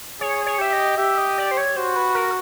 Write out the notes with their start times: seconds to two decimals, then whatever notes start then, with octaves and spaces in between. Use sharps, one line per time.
0.21 G#4 C#5
0.46 C#5
0.59 G4 E5
0.73 D#5
0.98 G4 E5
1.18 D#5
1.38 D5
1.51 C5
1.57 C#5
1.76 F#4 C5
1.96 B4
2.15 A#4